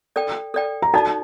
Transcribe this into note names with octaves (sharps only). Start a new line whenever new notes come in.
A4 D5 G5
A4 D5 G5
A#5
D#4 F#4 A4 D5 A5